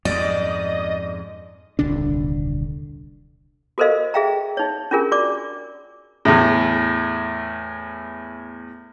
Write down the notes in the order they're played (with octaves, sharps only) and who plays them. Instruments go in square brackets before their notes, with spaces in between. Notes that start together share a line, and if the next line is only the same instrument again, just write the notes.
[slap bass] F2 G#2 [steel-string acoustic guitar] D5 [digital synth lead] D#5
[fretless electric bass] D#1 C2 D3 D4
[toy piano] F#4 A4 A#4 C5 D#5 F5
G#4 E5 F5 G5 A#5
D#4 C#5
C#4 D4 F4 G#4 A#4
F#4 D5 D6
[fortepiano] E2 A2